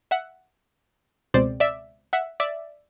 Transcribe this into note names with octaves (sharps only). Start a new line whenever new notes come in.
E5 F#5
C#2 B2 G#3 C4 C5 D5
D5 E5
E5 F#5
D5 E5